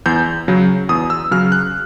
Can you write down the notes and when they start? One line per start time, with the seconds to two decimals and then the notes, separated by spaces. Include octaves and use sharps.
0.06 E2 G6
0.48 C#3 F#3
0.89 E2 D#6
1.10 E6
1.31 C#3 F#3 F6
1.52 F#6